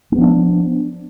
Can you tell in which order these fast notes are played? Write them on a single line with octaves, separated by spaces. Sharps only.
A#3 B3 F3 D4